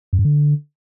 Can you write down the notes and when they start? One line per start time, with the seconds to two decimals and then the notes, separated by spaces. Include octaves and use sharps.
0.13 F#2
0.19 G2
0.25 D3